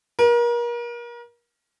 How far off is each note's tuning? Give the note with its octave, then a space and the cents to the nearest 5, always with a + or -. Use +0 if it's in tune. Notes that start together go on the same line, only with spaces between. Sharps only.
A#4 +35